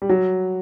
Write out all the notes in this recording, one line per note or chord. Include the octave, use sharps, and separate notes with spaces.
G3
F#3